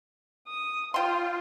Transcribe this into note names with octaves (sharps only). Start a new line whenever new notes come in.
D#6
F4 G5 C6